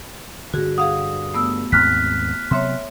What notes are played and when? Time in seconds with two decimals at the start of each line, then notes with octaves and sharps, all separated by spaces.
0.54 G2 D3 F#4 G#4
0.78 G#4 F5 F#5 D#6
1.34 A3 B3 E6
1.72 D#2 G#2 C4 F6 F#6 B6
2.51 C3 F#3 B3 C#5 E5 C6